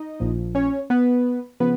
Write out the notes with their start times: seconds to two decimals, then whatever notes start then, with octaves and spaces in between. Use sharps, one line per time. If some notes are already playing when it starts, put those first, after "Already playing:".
Already playing: D#4 D#5
0.20 A#1 A#2 F3
0.55 C#4 C#5
0.90 B3 B4
1.60 C#3 F3 B3 B4